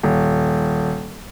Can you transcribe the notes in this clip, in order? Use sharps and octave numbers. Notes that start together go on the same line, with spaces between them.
D#1